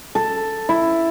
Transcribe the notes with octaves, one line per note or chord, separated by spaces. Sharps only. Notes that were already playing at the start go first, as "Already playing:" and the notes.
A4
E4